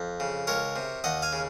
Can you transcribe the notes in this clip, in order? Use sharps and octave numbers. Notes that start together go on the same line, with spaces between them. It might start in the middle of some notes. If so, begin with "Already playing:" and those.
Already playing: F2
C#3
C#2 A#4 C#5
C3
D#2 D#5 F#5
F5 G#5
C#3